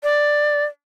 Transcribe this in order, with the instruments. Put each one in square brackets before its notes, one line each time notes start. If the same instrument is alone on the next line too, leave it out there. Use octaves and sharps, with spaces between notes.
[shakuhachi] D5